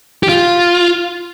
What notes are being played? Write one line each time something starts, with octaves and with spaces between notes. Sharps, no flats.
G4
F4